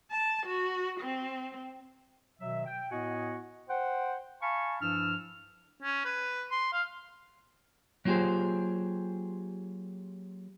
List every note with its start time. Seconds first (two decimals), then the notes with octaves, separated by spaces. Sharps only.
0.11 A5
0.46 F#4
1.00 C4
2.40 B2 D#3 F#3 E5
2.66 G5
2.91 A2 B3 F#4 D#5 F#5 G#5
3.68 C5 F#5 G5
4.41 F5 G#5 A5 B5 C#6
4.81 G2 F3 D4 E4 E6 F6
5.82 C#4
6.05 B4
6.51 C6
6.73 F5
8.05 F#3 A#3 F4 G4 G#4 C5